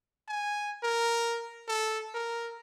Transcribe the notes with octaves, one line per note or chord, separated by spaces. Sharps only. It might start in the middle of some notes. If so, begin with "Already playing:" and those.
G#5
A#4
A4
A#4